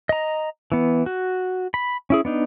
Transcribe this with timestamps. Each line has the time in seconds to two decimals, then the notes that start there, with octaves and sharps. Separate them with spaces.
0.09 D#5 A#5
0.72 E3 B3
1.06 F#4
1.74 B5
2.10 C#4 E4 G#4
2.25 B3 D4 D#4